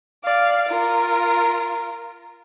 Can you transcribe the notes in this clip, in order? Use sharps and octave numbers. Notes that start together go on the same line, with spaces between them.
D5 F5
F4 A#4